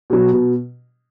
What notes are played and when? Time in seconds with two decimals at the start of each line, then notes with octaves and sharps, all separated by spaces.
0.10 B2 F#3
0.33 B2